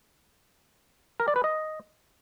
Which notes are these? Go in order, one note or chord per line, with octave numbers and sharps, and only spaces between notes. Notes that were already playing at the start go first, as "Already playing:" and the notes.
A#4
D5
B4
D#5